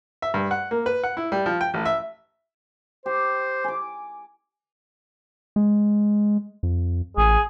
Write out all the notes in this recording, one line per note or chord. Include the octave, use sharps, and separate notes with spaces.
E5
G2
F#5
A#3
B4
F#5
E4
G3
F3
G5
A1
E5
G4 C5
G#5 D6
G#3
F2
A1 G#4